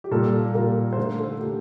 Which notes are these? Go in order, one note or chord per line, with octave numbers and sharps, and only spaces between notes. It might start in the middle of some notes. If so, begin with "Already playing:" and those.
G4
A#2 G3 A#3 A4
A#2 G3 A#3 A#4
C5
D3 A3 A#4
A4
D3 A3 G4